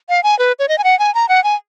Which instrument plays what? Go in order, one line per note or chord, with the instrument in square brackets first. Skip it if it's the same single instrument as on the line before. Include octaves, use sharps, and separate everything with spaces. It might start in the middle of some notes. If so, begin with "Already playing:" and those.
[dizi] F5
G#5
B4
C#5
D#5
G#5
F#5
G#5
A#5
F#5
G#5